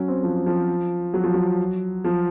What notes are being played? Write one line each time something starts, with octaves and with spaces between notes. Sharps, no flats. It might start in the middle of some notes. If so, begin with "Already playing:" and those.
Already playing: F#3 C#4
C4
F3
F3
F#3
F3
F#3
F3